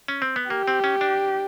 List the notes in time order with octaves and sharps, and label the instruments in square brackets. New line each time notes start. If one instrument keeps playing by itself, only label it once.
[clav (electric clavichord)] C#4
C4
B3
[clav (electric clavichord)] A#3 [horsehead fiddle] G4
[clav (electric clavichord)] C4
C#4
D4